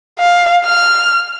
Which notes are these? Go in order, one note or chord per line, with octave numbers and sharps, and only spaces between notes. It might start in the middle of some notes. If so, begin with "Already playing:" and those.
F5
F6